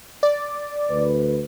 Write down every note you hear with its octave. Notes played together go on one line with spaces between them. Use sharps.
D5
D2 B4